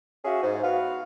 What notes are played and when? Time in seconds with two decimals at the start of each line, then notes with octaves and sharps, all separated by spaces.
0.25 C#4 F#4 G#4 E5 F5
0.43 G#2
0.63 B3 F#4 B4 F5